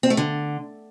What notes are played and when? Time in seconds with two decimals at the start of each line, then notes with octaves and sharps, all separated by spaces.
0.03 C4
0.10 A3
0.17 D3